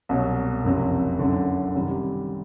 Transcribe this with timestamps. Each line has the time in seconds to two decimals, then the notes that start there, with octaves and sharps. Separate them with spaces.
0.09 C2 B2 F#3
0.64 F#1 F2 C3
1.19 F#1 F#2 D3
1.74 C3 D#3 G3